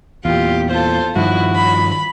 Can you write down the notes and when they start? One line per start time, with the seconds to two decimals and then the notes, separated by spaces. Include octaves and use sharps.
0.25 E2 A#2 F4 G4
0.70 F4 A4 C5
1.16 G2 D#3 F3 E4 F#4
1.55 B5